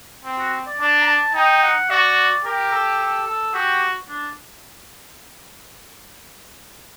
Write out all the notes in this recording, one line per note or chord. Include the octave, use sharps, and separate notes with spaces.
C4
F#4
D5
D4 A5
A#5
A5
D#4 G5
F#5
F#4 D5
G4 A#4
A4
A4
A4
F#4 G4
D4